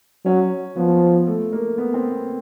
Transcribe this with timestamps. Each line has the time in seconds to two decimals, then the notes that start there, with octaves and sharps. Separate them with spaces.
0.25 F#3 C#4
0.77 F3 B3
1.27 A3
1.52 A#3
1.78 B3
1.94 C4
2.12 B3